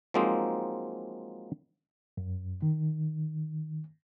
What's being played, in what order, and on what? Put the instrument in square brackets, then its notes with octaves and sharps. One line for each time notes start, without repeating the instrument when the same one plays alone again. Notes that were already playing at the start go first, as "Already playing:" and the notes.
[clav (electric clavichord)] F3 F#3 G#3 A#3 C4 D#4
[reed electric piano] F#2
D#3